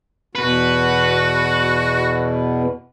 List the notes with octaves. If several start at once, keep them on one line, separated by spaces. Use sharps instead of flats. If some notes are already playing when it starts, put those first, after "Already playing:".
E2 B2 F#4 B4